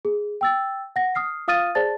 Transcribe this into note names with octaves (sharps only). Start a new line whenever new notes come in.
G#4
G5 E6 A6
F#5 A#6
D#6 F6 C7
F4 F5 D#6 F6 A6 D#7
G#4 C5 D5 A5 A6